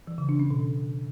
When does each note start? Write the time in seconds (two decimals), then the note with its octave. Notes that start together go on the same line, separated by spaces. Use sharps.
0.07 E3
0.18 C#3
0.29 D4
0.40 C#4
0.50 B2